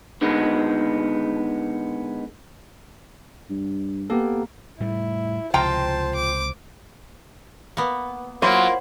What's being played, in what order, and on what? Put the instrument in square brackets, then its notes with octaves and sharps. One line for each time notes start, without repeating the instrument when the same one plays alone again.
[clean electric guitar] D3 D#3 G#3 B3
[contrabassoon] G2
[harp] A#3 [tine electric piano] B3 G4 A4
[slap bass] A2 G3 A3 [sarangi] E4
[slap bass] C#2 C3 F3 [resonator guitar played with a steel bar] F4 G5 A#5 [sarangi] C5 [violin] A5
[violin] D6
[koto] A#3 B3
[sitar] F#3 [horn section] A#3 F4 [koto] E4 [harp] C5